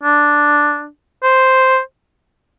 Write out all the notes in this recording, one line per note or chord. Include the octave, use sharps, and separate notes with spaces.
D4
C5